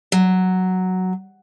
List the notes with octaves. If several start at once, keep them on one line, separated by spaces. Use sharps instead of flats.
F#3